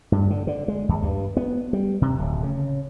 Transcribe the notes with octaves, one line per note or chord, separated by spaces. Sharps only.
G2
D3
D3
G#3
D#2
G2
B3
G3
C3
D1
C#3